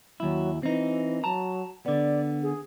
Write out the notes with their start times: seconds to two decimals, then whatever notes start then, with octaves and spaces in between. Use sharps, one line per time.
0.20 D#2 F#3 E4
0.63 E3 C4 D#4
1.24 F#3 A5 A#5
1.86 D3 B3 D5
2.43 G#4